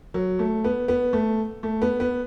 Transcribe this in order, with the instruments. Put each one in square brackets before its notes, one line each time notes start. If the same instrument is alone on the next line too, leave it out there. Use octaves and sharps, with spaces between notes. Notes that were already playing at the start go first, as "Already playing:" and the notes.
[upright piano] F#3
A3
B3
B3
A3
A3
B3
B3